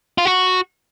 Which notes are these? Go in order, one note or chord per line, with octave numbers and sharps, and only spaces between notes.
F4
F#4